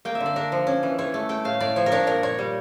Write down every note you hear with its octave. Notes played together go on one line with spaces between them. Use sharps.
A#3 G5
E5
D3
D5
D4 A#4
F3
C#4
E3
E3 C#5
A3
A3 G5
A2 F5
A2 D5
F3 C#5
A#4
D4 C#5
A#2 A#4
A#2 C#5
G3